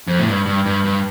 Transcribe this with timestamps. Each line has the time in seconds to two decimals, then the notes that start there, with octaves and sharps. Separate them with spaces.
0.07 F2
0.19 A2
0.27 G2
0.46 G2
0.66 G2
0.85 G2